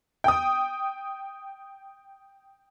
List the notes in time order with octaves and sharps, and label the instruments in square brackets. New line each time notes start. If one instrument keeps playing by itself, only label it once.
[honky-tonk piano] G5 D#6